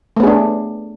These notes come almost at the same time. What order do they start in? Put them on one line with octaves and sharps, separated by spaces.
A3 B3 G#4 D4